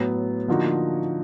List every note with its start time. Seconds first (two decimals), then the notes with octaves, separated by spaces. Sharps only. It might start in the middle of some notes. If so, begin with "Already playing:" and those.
Already playing: A2 F#3 B3
0.48 D3 F3 A#3 D#4 F#4